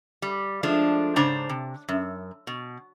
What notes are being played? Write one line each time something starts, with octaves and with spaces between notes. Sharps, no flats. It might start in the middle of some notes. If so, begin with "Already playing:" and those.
G3
F3 G#3 A3 D4
G#2 C#3 D4 C5 A#5
C3
F#2
B2